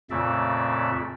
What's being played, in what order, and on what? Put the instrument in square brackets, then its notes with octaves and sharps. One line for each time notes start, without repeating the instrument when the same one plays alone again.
[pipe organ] F2 A#2 C#3 A3 D5 E5